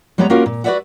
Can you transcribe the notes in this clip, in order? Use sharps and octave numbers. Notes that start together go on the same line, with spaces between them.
G3 G#3 B3 C#5 A#5
A#3 C#4 F4 F#4 A#4 F5
A#2
F#4 B4 C#5 D5 E5 F#5